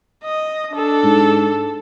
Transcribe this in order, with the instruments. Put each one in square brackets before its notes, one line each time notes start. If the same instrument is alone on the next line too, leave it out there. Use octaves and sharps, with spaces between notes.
[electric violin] D#5
D4 A4
[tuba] G#2